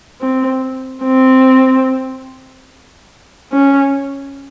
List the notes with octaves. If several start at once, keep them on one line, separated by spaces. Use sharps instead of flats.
C4
C4
C#4